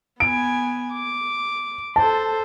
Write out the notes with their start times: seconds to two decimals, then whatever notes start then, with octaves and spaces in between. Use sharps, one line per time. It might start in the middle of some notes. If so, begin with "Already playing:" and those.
0.20 B3 G#5 D7
0.93 D6
1.96 A4 C5 A5